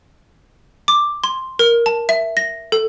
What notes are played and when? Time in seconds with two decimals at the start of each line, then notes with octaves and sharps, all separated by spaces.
0.88 D6
1.24 C6
1.59 A#4
1.86 A5
2.09 E5
2.37 A#6
2.72 A4